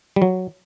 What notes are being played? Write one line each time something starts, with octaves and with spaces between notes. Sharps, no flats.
G3
F#3